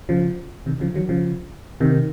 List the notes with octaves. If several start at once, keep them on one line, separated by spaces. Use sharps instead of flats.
C#3 F3
C3 D#3
C#3 F3
D#3 F#3
C#3 F3
C3 D#3